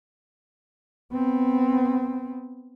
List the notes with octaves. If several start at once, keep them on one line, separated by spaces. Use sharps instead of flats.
B3 C4